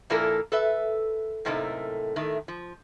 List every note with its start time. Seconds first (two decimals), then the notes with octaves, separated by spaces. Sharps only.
0.10 A#2 F3 A#3 E4 A4 A#4
0.52 A4 B4 E5
1.45 F#2 A2 C3 A3 A#3 D#4
2.16 A2 D#3 A3
2.48 F3